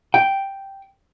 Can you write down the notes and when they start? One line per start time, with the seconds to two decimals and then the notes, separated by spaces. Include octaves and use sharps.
0.14 G5